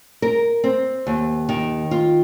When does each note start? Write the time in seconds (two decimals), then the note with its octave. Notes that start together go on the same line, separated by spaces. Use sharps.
0.22 A#4
0.64 C4
1.07 D#2
1.49 D#3
1.91 F4